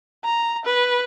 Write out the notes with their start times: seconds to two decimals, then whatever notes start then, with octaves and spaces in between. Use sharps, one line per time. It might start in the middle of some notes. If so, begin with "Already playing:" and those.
0.24 A#5
0.65 B4